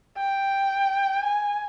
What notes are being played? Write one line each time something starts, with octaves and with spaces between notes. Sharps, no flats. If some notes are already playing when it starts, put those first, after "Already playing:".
G5
G#5